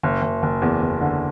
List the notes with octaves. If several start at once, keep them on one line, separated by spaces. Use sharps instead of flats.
F#1
F#1
F#1
E2
E2
D3